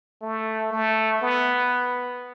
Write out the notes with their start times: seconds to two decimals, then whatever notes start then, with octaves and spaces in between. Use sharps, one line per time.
0.22 A3
0.71 A3
1.22 B3